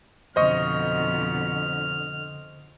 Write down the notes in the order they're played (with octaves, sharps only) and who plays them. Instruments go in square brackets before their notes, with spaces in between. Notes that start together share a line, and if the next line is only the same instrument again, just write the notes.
[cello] F2 B2 [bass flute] D3 [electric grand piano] C5 D#5 C#6 [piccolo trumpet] F6